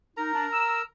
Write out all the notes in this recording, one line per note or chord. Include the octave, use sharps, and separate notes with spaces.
D#4 A#4 A#5
D4
E6